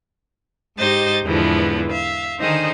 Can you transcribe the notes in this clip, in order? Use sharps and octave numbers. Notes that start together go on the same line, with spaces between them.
G#2 D#4 G4 C5 D#5 A6
E2 G#2 D3 E3 F3 B3
E5 F5
D3 D#3 D#4 G#4 C5